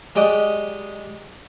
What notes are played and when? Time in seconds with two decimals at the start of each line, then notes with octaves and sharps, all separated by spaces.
0.15 F#3 G#3 G4 D5 D#5 F#5